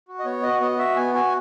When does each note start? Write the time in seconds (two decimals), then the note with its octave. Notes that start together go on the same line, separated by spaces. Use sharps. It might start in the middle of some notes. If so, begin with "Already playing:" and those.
0.08 F#4
0.19 D#5
0.25 B3 C#5
0.43 F#4 D#5
0.61 B3 D#5
0.78 F#4 E5
0.96 B3 G#5
1.14 F#4 G#5